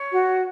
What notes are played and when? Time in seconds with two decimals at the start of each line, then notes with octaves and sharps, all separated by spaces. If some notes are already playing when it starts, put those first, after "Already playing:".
Already playing: C#5
0.11 F#4